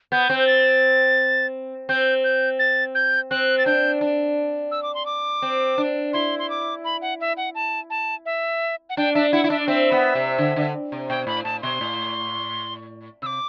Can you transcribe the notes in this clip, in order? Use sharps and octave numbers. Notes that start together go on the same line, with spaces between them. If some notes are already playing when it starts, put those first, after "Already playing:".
B3 G6
C4
G6
A6
C4 G6
G6
A6
G6
C4 F#6
A6
D4 G6
D4
E6
D6
C6
D6
C4
D4
E4 C6
C6
D6
B5
F#5
E5
F#5
A5
A5
E5
F#5
D4 G5
D4 E5
E4 F#5
E4
D4 E5
D5
C4 E5
B3
C3
D3
D3
C3
B2 G5
A2 B5
A2 A5
B2 C6
A2
C3 D6 E6